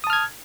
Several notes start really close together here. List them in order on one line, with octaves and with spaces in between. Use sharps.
D#6 A5 F6 G#6